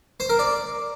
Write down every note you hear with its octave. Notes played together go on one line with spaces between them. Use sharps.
C5
A#4
D5